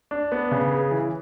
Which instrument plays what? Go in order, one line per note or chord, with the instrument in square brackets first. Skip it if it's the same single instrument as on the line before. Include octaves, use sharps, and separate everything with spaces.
[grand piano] D4
B3
C#3
G#4
E3